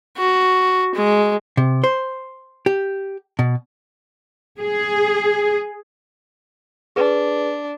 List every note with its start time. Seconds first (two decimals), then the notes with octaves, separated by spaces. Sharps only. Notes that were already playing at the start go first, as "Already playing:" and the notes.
0.17 F#4
0.95 G#3
1.57 C3
1.84 C5
2.66 G4
3.39 B2
4.59 G#4
6.96 D4 G#4 B4